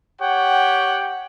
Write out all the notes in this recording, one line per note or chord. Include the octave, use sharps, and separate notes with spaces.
G4 C#5 F#5 G5